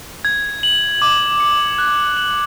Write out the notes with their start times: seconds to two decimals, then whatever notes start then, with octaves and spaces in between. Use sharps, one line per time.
0.25 G#6
0.63 F#7
1.02 D6
1.40 C#7
1.78 F#6
2.17 F#7